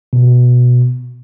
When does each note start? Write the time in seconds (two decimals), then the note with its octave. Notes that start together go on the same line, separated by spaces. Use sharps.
0.13 B2